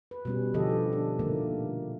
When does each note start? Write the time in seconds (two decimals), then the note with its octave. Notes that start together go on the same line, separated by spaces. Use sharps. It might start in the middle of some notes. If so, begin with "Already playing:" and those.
0.11 B4
0.25 B2 G3 C#4
0.54 D3 F3 C#4 G4 A4 D#5
0.93 D4
1.19 A#2 D3 D#3 A3 A#3